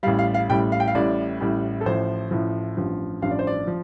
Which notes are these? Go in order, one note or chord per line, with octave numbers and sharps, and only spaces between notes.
A1 A2 G3 F5
F5
F5
A1 A2 G3 G5
F5
G5
F5
A1 A2 G3 D5
A1 A2 G3
A4
A1 A2 F3 C5
A1 A2 F3
A1 G2 F3
A1 G2 F3 F5
D5
C5
D5
F3